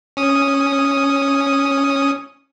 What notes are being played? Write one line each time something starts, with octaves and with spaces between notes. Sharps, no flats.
C#4 D#6